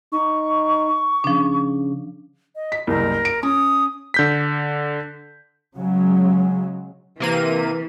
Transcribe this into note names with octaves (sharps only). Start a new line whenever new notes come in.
D#4 C#6
C#3 F3 D4
D#5
B6
F#1 C2 A#4
D7
C#4 D#6
D3 G6 B6
C#3 F#3 G#3
C3 E3 A#3 D#7